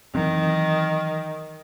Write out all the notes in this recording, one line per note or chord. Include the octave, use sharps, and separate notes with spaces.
D#3 E3 F#3 C4